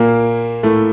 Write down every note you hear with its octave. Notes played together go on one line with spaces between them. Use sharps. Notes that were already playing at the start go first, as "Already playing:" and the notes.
Already playing: A#2 A#3
A2 A3